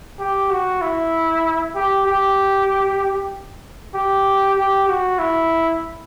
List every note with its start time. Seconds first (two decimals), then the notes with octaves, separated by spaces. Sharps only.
0.19 G4
0.50 F#4
0.82 E4
1.75 G4
2.06 G4
3.94 G4
4.56 G4
4.88 F#4
5.19 E4